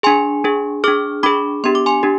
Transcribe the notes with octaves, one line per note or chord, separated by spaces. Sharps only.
D4 G#4 G#5 C6
D4 G#4
D4 G#4 D6 F6
D4 G#4 B5 D6
B3 D4 G4 C6
D6
G#5 C6
D4 G4